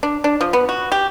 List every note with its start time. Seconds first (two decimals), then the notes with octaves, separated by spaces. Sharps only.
0.03 D4
0.24 D4
0.41 F3
0.53 B3
0.69 F#4
0.92 G4